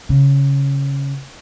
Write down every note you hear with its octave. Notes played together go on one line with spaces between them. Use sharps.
C#3